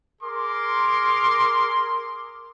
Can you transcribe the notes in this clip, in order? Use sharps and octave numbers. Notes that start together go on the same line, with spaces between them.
G#4 A#4 C6 D6